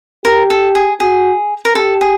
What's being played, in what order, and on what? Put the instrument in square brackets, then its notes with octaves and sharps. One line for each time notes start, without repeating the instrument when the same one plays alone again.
[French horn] G4 [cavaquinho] A#4
[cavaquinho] A4
G#4
[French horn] F#4 [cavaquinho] G#4
[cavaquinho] A#4
[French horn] G4 [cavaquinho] A4
[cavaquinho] G#4